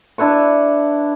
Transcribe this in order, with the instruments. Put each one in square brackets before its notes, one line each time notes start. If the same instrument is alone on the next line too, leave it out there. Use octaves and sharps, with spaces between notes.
[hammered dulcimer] D4 E4 B4 C#6